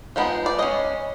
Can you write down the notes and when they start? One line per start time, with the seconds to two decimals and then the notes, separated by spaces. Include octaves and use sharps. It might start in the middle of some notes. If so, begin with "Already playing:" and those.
0.16 F3 G#3 B3 D#4
0.46 D5
0.59 G#3 C#4 D#5